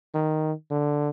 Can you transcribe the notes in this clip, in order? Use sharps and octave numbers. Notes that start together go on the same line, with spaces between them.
D#3
D3